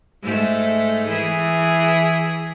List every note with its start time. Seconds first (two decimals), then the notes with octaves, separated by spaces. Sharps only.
0.23 G#2 A3
1.08 E3 G#4